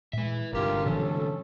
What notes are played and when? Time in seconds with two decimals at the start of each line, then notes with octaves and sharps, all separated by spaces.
0.13 A#2 G#3 B4 E5
0.52 G1 C2 D3 F4 G4 A#4
0.86 B2 E3 F#3 C#4 A4